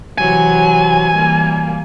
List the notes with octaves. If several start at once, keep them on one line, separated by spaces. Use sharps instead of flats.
C3 E3 F#3 G#5
E3 G3 A#3